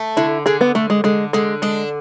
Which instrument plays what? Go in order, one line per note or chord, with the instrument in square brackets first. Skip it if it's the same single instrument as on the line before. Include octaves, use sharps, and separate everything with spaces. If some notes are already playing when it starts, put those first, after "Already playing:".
Already playing: [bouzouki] A3
[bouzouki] D3 [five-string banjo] E4
[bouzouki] D3 [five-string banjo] G#4
[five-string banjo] B3
[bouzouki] D3 [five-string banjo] A3
[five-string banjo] G#3
[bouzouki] D3 [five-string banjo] G#3
[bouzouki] D3 [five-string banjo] G#3
[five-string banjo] G#3 [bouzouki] D4